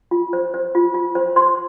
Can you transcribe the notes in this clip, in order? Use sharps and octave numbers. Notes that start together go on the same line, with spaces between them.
F4
C5
C5
F4
F4
C5
C5 C6